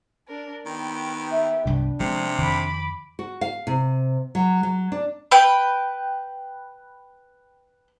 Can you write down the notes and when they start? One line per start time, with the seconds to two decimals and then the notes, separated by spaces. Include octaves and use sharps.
0.28 D4 A#4
0.66 D#3 B3 G4
1.31 E5
1.66 C2 G2 C3 D4
2.00 C3 F3 G#3 C4
2.38 F2 D#3 B5 D6
3.19 F#4
3.41 F5
3.67 C3
4.35 F#3
4.63 F#3
4.92 D4
5.31 B4 G5